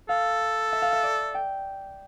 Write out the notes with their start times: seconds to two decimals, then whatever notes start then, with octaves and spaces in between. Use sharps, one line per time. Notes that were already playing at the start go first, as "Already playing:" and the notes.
0.09 A4 F5
0.72 E5
0.82 F5
0.92 E5
1.03 D5
1.34 G5